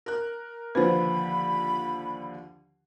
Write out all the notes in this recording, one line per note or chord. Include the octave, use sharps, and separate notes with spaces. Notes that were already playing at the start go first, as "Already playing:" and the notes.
A#4 F#6
D#2 D3 F3 B4 C5 B5